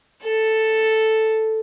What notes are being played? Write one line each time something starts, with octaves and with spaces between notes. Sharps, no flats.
A4